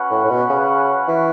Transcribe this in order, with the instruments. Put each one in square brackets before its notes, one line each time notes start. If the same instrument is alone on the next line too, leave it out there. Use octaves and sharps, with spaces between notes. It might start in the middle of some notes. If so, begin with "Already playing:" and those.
Already playing: [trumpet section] C#4 F#4 B4 F#5
[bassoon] A2
A2
B2
C#3
E3